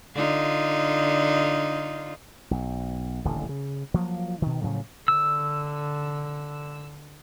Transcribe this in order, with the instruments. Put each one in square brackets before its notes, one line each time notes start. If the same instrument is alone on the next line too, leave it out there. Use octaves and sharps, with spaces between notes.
[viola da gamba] D3 D#4 F4
[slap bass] B1
D#1 A1 D3
C#3
F3 F#3 A#3
B2 D#3
A2 C#3 F3 F#3
[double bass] D3 [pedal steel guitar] E6